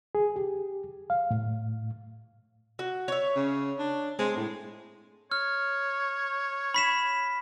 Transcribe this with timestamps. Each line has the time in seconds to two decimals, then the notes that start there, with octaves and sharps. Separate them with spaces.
0.15 G#4
0.36 G4
1.10 F5
1.31 A2
2.79 F#4
3.08 C#5 E5
3.36 C#3
3.79 D4
4.19 G#3 C4
4.37 A2
5.32 C#5 F6
6.74 B5 B6 E7